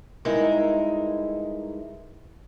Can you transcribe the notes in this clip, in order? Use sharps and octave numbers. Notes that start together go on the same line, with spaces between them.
G2 G#3 D#4 E4 A#4